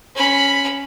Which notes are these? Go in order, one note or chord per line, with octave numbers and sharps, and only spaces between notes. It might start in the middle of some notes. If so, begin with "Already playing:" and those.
C#4 B5